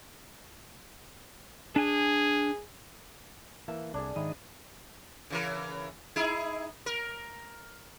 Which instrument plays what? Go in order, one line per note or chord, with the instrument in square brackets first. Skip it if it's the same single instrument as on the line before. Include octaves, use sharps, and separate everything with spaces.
[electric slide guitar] D4 G#5 [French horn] G#4
[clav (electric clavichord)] E3 A#3 E5 [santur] A5
[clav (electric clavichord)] C2 [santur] D4 G#4 [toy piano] A4 D5
[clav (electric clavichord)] G#2 [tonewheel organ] D#3 D#5 [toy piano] E5 G5 B5
[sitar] C#3 E3 A#4
D#4 E4 G#4
A#4